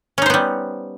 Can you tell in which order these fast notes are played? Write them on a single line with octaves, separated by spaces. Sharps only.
C#4 D#4 C5 B3 G3